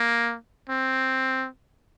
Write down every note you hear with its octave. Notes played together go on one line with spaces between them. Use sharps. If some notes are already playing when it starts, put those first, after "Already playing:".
Already playing: A#3
C4